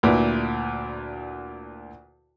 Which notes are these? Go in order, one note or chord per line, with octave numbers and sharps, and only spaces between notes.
D2 A#2 E4 B4